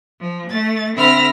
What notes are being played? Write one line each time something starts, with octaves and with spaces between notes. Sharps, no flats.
F3
A3 A6
D3 C4 E5 B5 F6 A#6